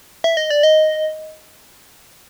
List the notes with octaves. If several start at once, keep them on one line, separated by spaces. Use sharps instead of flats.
E5
D#5
D5
D#5